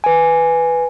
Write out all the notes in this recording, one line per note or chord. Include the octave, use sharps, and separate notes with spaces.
B4 G#5